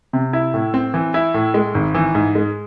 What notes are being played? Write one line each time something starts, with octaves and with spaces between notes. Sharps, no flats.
C3
E4
A2
C4
E3
E4
A2
G#3
G#1
E3
G#2
G#3